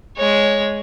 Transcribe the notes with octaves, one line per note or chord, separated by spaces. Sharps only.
G#3 C#5